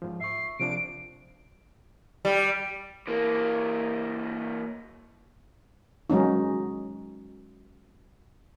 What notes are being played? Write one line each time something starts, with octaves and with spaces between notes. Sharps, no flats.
G#2 F3
E5 C#6 C7
C3 F3 D4 D7
G3
E3 A#3
F#3 G#3 C#4 D#4